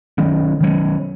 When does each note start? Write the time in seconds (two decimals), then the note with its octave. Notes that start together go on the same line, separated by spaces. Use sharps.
0.18 D#3 F#3 A3 C#4
0.61 D#3 F#3 A3 C#4